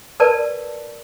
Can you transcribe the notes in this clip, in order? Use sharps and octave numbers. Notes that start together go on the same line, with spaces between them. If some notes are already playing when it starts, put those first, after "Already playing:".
A#4 B4 D5 A5